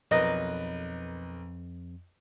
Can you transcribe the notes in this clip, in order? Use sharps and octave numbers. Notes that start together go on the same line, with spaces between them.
B1 F2 A#4 B4 D#5